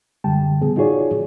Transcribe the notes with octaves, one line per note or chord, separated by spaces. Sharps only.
F#2 D3 G3 G5 A5
C#3 B3 G#4
D#4 F4 F#4 G#4 C#5 D5